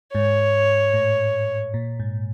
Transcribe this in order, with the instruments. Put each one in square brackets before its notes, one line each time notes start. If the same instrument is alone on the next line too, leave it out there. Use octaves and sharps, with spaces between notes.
[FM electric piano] G#2 [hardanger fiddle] C#5
[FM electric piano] A2
A#2
G#2